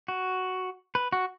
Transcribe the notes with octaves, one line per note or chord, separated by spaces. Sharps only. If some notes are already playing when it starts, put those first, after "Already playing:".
F#4
B4
F#4